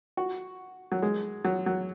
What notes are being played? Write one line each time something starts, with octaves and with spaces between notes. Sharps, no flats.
F#4
F#3
G#3
F#3
F#3